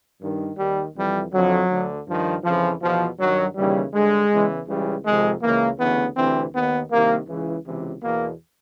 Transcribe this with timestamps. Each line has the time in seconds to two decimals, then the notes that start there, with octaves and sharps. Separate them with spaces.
0.21 G2 D#3
0.58 D#2 D#3 G3
0.96 F2 C3 E3 G3
1.33 F2 D3 F#3
1.69 D2 D3
2.07 G2 D#3 F3
2.44 F2 C#3 E3 F3
2.81 E2 B2 F3
3.19 G2 D#3 F#3
3.56 D#2 C#3 E3 G3
3.93 G2 D3 G#3
4.31 E2 C#3 E3
4.67 C#2 C#3 E3 G3
5.04 F2 C3 D#3 G#3
5.41 C#2 C#3 E3 A#3
5.79 D2 C#3 E3 B3
6.16 D2 C3 E3 C4
6.53 D#2 D#3 B3
6.90 C2 C3 D#3 A#3
7.27 C#2 C#3 E3
7.65 C#2 C3 E3
8.03 E2 B2 A#3